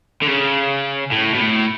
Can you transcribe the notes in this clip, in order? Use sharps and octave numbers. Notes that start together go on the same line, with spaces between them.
D3
C#3
A2
B2
A2